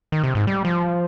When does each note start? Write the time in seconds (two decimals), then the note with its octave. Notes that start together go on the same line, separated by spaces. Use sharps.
0.12 D#3
0.24 C3
0.35 G#2
0.47 G3
0.65 F3